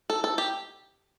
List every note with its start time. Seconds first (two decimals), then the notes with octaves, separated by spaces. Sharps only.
0.10 A4
0.24 A4
0.38 G4